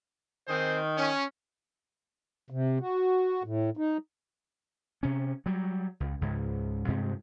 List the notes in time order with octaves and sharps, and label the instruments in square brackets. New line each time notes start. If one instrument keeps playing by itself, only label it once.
[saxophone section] D#3 [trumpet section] C4 G#4 C5
[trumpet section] C#4
[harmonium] C3
F#4
A2
D#4
[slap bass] C3 C#4
F#3 G3
C#2
C#2 G#2
G2 C3 G#3 C4